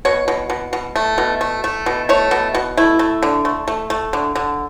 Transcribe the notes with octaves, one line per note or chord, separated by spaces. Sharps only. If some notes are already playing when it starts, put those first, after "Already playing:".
B2 C#5
B2
B2
B2
A3
B2
A3
A3
B2
A3 C#5
B2
B2
A3 E4
A3
D3
A3
A3
A3
D3
D3